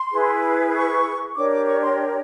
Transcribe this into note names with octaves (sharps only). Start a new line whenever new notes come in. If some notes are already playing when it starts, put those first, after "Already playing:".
Already playing: C6
E4 G#4 B4
C#6
D4 G4 A#4 C#5 D6
D6
C#6
C6